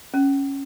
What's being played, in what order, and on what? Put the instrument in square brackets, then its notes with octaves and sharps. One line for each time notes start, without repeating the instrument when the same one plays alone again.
[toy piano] C#4